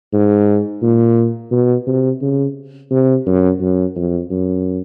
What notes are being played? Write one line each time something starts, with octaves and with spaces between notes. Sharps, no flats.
G#2
A#2
B2
C3
C#3
C3
F#2
F#2
F2
F#2